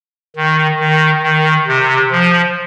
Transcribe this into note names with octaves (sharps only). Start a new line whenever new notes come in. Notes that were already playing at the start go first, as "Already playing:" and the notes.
D#3
D#3
D#3
C3
F3